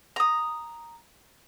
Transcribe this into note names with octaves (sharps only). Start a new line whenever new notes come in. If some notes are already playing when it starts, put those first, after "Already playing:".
A#5 D#6